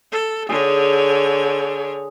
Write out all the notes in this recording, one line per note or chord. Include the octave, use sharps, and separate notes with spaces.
A4
D3 G#4 C#5